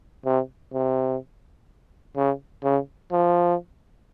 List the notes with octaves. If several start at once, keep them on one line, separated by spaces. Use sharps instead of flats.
C3
C3
C#3
C#3
F3